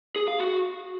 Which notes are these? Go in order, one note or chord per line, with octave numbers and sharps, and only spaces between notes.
G#4
F5
F#4